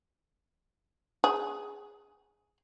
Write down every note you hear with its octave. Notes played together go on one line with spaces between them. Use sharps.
G#4